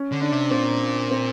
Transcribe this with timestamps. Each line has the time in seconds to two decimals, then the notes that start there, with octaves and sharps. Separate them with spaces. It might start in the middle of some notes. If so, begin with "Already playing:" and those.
Already playing: C#4
0.12 D3
0.22 D4
0.32 C3
0.51 A#2 C4
1.11 C4